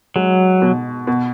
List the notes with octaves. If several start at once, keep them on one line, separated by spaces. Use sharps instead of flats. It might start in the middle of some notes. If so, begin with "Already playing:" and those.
F#3 G#3
B2
B2